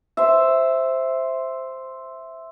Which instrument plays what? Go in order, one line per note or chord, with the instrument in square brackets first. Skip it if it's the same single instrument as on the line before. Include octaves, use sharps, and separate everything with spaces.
[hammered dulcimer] C5 E5